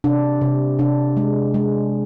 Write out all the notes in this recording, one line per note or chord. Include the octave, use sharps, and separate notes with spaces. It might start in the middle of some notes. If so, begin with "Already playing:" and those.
C3 D4
C3
C3 D4
G#3
G#3